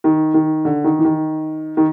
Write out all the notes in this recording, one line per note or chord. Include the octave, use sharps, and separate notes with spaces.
D#3
D#3
D3
D#3
E3
D#3
D#3